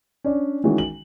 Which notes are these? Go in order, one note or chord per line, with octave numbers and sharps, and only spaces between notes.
C#4 D4 D5
D#3 E3 G#3 C#4 F#4
F#7